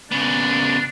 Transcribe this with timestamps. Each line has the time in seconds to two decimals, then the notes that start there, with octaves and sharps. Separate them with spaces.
0.12 C#3 B3 D4